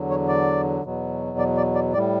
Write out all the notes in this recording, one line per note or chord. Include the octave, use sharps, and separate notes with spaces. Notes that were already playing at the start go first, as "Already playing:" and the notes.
Already playing: E2 D3 F#3
C#5
D5
E2 B2 F#3
D5
D5
D5
A2 G3 D5